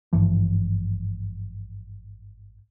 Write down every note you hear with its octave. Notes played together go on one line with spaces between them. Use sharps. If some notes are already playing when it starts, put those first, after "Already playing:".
G#1 G2 E3 F3